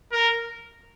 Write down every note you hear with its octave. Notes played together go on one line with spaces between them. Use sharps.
A#4